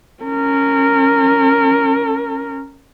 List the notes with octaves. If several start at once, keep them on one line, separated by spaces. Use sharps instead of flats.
C#4 A#4